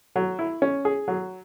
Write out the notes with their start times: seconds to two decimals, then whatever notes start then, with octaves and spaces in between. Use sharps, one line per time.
0.16 F#3
0.39 E4
0.62 C#4
0.85 G#4
1.08 F#3